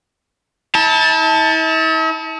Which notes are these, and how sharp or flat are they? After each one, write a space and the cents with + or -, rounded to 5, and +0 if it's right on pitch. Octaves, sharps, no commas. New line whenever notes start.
E4 -45 A5 +0